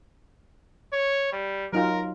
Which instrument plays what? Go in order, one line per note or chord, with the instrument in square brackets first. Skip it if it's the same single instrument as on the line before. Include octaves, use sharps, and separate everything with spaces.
[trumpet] C#5
G3
[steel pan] F#3 D#4 F4 [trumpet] A#4